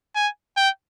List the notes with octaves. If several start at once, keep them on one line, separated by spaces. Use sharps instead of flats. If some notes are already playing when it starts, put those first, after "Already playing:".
G#5
G5